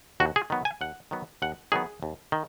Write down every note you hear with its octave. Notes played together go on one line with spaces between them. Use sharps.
D#2 F#4
G#4
D#3 F#3 B3
G#5
D#2 F#5
D#3 F#3 B3
D#2 F#5
D#3 F#3 B3 G#4
D#2
D#3